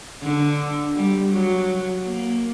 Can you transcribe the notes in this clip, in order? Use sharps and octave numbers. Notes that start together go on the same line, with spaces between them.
D3
G3
F#3
A#3